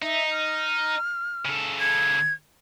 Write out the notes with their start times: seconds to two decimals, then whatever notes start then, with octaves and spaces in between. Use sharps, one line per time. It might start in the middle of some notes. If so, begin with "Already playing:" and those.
0.02 D#4 E5
0.32 F6
1.45 C#3 A4
1.80 G#6